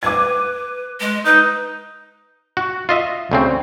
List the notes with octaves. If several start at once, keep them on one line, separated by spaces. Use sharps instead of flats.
B4 D6 G#6
G#3
D#4 B4
F#4
F4 D#5 E5
D2 C#3 C4